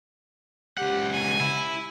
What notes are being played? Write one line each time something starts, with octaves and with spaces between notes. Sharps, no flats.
C#2 G4 F#5
G#5
E4